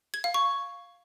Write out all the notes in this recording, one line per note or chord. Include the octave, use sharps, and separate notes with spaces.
G#6
F5
C#6